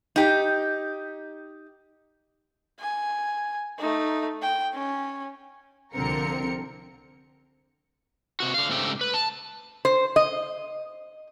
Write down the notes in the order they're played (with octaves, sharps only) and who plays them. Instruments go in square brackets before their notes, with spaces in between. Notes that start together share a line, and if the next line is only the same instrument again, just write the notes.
[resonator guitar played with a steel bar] D#4 G4
[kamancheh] G#5
A3 D#4
G5
C#4
[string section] C2 D3 F3 C4 A#4 C#7
[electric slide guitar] C3 F#4
D3 F5
G#2 C#3 A3 C4 G4
B4
A5
[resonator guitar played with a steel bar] C5
D#5